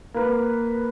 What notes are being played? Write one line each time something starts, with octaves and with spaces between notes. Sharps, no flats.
A#3 B4